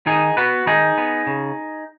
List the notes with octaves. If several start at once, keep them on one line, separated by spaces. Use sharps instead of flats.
D#3 D#4 G#4
B3 F#4 B4
D#3 D#4 G#4
B3
C#3